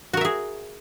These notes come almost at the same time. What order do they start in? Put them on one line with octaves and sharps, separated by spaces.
F#4 A#4 E5 G#4